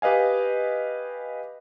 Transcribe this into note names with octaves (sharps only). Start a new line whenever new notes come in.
G4 B4 D#5 F5 G#5